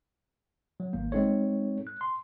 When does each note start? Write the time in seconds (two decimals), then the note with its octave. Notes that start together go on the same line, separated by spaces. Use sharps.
0.80 F#3
0.93 G#1 A#3
1.12 G#3 C4 D#4 A4 C#5
1.87 F#6
2.01 C6